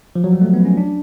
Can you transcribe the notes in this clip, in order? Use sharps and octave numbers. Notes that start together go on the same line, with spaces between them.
F3
F#3
G3
A3
B3
C#4
D4